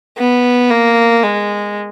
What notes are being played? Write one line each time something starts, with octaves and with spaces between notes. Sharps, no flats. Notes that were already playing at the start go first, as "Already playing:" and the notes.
B3
A#3
G#3